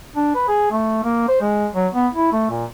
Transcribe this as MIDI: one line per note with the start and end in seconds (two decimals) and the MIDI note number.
0.16 0.34 62
0.35 0.43 71
0.48 0.67 68
0.71 1.00 57
1.04 1.27 58
1.28 1.39 72
1.41 1.68 56
1.74 1.87 54
1.94 2.08 59
2.14 2.32 64
2.32 2.46 57
2.50 2.65 46